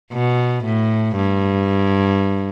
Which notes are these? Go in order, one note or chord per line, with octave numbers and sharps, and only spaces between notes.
B2
A2
G2